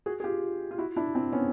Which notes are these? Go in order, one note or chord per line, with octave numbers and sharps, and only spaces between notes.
F#4 G#4
G#4
F4 G4
F4
E4 F#4
D4 E4
C4 D4
B3 C#4